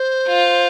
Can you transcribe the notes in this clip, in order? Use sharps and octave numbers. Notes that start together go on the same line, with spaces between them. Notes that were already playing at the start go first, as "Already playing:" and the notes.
Already playing: C5
F4